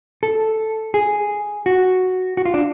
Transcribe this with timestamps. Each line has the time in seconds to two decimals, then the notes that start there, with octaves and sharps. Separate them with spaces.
0.23 A4
0.94 G#4
1.66 F#4
2.37 F#4
2.46 F4
2.54 D4